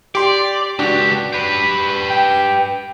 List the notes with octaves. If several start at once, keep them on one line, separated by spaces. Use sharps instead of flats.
G4 D5 C6
C#2 D4 F#4 G4
G4 B4
G5